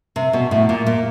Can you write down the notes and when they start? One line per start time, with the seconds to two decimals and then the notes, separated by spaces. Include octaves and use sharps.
0.16 C3
0.33 B2
0.51 A2
0.69 A#2
0.87 A#2